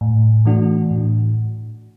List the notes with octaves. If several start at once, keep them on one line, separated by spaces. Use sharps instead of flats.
A2
E3 A3 D4 F#4
A2